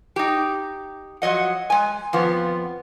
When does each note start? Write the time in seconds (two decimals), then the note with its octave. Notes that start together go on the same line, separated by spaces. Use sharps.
0.16 D#4 G4
1.22 F3 F#3 D#5 F#5
1.70 G#3 G#5
2.13 F2 F3 B3